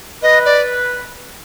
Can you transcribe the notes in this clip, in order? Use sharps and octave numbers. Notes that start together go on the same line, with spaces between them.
B4 D#5
D5